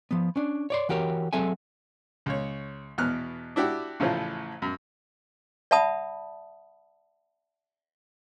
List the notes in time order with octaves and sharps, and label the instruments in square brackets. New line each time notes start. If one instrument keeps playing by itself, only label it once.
[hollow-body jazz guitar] F3 B3
C#4 D4
C#5 D5 C6
E3 F#4 G4 A#4 C#5
F#3 C4 G#4 A4 E5 G#5
[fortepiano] C#2 C#5
E2 B2 F6 F#6
D4 E4 F#4 G4
A1 A2 C#3 E3 F3
F#2
[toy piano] D5 E5 F#5 A5 B5 D#6